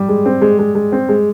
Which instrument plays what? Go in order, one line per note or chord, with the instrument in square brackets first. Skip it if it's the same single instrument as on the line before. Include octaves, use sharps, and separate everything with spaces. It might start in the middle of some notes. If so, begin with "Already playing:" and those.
Already playing: [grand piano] G3
[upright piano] G#3
C4
G#3
G#3
G#3
C4
G#3